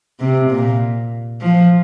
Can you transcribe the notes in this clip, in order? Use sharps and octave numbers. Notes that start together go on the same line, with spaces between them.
C3
A#2
F3